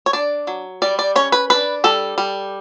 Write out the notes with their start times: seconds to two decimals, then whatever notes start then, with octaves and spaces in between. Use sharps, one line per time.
0.06 C#5
0.13 D4 D5
0.47 F#3
0.82 G3 D5
0.99 D5
1.16 C#4 C#5
1.32 B4
1.50 D4 B4
1.84 G3 A4
2.18 G3